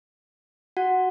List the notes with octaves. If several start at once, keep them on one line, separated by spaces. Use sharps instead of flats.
F#4 F#5